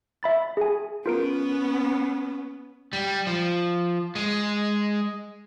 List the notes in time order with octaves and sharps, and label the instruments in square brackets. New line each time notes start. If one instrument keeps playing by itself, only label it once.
[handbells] E5 B5 A6
G#4 G#5
[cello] B3 C#4 [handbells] F4 A#4 D7
[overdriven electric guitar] G3
F3
G#3